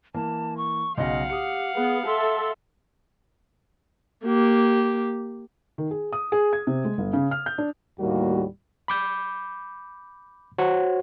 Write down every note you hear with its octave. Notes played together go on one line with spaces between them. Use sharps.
E3 A#3 A5
C#6
B1 C#3 D#5 F5 F#5
G4 D#6 C#7
B3 G#4
A4 E5 C6
A#3 G4
D#3
G#4
D#6
G#4
G#6
C3
G#3
G1
C#3
F6
G6
D4
D#2 A2 G3 A#3 F#4
B5 D6 G6
F#4 C5 C#5 F#5